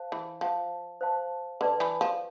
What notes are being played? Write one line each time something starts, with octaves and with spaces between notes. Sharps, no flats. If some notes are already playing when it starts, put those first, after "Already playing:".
Already playing: C5 F5 A5
E3
F3 C5 F5 A5 C6
C5 F5 A5 C6
D3 B4 D5 A5 C6
E3
F3